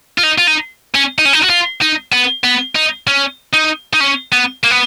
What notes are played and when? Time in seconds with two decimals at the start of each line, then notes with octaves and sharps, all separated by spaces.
0.18 F4
0.23 D#4
0.38 F4
0.47 D#4
0.95 C#4
1.19 D#4
1.25 C#4
1.33 D#4
1.44 F#4
1.50 F4
1.81 D#4
2.12 B3
2.44 B3
2.76 D#4
3.07 C#4
3.53 D#4
3.93 D#4
4.00 C#4
4.33 B3
4.64 A#3
4.71 B3